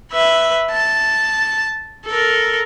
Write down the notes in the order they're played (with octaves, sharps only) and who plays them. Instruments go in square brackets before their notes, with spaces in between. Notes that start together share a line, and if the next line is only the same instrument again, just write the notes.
[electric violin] B4 E5
A5
A4 A#4